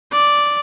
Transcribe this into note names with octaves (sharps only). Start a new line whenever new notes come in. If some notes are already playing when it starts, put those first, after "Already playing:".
D5